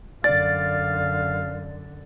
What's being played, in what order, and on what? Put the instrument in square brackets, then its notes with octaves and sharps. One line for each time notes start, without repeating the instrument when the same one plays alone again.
[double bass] F#2 D3 [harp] D5 [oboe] F5 [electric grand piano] A6